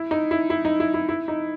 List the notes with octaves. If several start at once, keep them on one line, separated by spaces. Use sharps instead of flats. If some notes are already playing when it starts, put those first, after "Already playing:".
Already playing: E4
D#4
E4
E4
D#4
E4
E4
E4
D#4